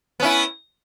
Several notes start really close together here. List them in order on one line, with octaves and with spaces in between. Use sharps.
B3 C#4 E4